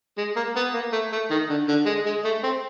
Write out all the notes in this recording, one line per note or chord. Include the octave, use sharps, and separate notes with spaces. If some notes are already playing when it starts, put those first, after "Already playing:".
G#3
A#3
B3
A#3
A3
A3
D#3
D3
D3
G#3
G#3
A3
C4